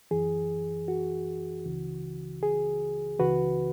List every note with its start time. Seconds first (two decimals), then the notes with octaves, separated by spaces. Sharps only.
0.11 F#2 E3 G#4
0.88 F#4
1.65 C#2 C#3 E3
2.43 G#4
3.19 C#2 C#3 E3 F#4 B4